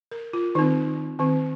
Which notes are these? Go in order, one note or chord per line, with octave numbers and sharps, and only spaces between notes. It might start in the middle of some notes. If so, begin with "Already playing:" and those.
A#4
F4
D#3 C4 D#4
D#3 C4